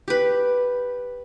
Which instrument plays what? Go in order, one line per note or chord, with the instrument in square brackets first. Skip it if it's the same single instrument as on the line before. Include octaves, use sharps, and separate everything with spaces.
[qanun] G4 B4